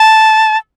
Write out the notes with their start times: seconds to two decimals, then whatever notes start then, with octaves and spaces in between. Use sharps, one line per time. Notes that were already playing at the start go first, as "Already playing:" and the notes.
Already playing: A5